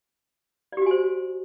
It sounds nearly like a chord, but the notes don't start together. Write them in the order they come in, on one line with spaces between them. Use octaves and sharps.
D5 G4 F#4 G#5 C5